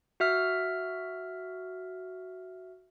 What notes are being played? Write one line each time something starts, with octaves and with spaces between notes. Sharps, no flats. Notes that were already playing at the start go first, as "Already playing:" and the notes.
F#4 E5 F6